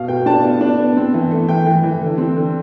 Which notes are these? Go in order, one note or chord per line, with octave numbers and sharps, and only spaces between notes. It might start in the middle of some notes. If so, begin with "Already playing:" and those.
Already playing: B2 F5
B3 G5
D4 A5
B3
D4
B3
C4
E3
A3
E3 G5
E3
E3
D3
C4
D3